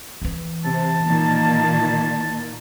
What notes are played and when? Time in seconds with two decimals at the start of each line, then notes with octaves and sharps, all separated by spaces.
0.22 E2 E3
0.65 C3 A5
1.06 A#2 D#3 A#3